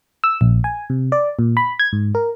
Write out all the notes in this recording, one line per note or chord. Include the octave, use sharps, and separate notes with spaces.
E6
A#1
G#5
C3
D5
A#2
B5
G#6
G#2
A#4